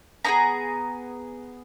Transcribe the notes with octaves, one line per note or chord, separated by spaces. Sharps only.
B3 E4 G#4 A#5